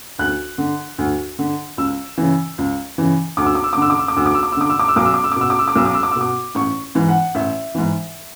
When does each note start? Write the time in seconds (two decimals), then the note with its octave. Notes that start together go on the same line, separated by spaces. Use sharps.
0.19 D2 F#6
0.58 D3
0.98 D2
1.39 D3
1.78 C#2 E6
2.18 C#3 E3
2.58 C#2
2.98 C#3 E3
3.37 D2 D6
3.46 E6
3.55 D6
3.64 E6
3.73 D6
3.77 D3 E6
3.90 D6
3.99 E6
4.08 D6
4.17 D2 E6
4.26 D6
4.34 E6
4.43 D6
4.52 E6
4.57 D3 D6
4.70 E6
4.79 D6
4.88 E6
4.96 B1 D6
5.05 E6
5.14 D6
5.24 E6
5.32 D6
5.36 B2 E6
5.50 D6
5.59 E6
5.68 D6
5.76 B1 E6
5.86 D6
5.94 E6
6.03 D6
6.11 E6
6.16 B2
6.21 D6
6.55 A1 C#6
6.95 G#2 E3
7.09 F#5
7.35 A1 E5
7.75 G#2 E3